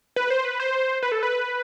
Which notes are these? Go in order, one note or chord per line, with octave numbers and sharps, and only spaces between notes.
B4
C5
B4
C5
B4
A4
B4